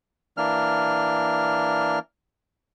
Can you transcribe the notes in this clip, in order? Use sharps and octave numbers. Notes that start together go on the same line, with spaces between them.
E3 A#3 D4 F6